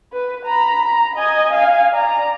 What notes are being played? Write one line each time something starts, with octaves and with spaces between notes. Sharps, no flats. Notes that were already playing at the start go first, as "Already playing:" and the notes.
B4
A#5 B5
A#5
D#5 G#5
F5 G#5
D5 A#5